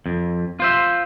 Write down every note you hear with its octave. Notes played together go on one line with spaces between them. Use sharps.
F2
F4 C5 E5